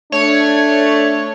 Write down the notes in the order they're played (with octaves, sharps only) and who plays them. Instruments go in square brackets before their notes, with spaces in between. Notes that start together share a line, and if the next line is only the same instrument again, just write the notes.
[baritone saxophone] A3 [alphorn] D4 [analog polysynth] C#5